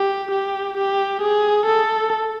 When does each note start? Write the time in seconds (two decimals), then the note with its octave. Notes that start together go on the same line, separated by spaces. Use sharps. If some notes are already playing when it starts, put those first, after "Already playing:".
Already playing: G4
0.31 G4
0.77 G4
1.22 G#4
1.66 A4